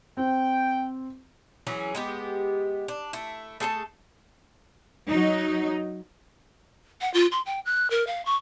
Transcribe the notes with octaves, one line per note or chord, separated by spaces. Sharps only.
C4 G5
E3 F#3 C#4 G#4
G#3 B3 G4
D4
A3 E4
A3 G#4 A4 A5
F#3 D#4
F#5
F4
C6
G5
F#6
A#4
F5
C#6